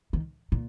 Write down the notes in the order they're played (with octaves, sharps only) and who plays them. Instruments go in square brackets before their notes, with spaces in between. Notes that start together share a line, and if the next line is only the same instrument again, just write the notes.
[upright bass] D#3
A#2